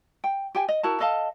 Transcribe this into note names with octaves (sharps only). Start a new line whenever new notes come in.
G5
G4 G5 G#5
D#5
E4 F#4 A#4 A5
A4 D#5 F5 A5